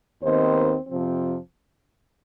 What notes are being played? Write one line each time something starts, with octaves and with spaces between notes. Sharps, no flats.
D#2 D#3 B3 C4 D#4 C5
F2 C3 F3 C4